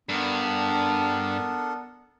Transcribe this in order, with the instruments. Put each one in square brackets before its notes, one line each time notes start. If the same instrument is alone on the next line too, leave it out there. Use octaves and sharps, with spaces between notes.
[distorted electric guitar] G2 [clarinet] B3 [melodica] D4 A4 A#4